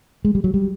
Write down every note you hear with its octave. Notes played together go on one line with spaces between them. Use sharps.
G#3
G3
F#3
G3